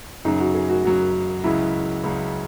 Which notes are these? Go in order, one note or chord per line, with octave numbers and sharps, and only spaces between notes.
F#2 C#3 F#3 D#4
F#4
G#4
F#4
F#2 C#3 F#3 F#4
C#2 C#3 F#3 E4
C#2 C#3 F#3